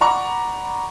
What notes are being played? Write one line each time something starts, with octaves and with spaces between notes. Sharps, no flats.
D5 F#5 A#5 B5 C#6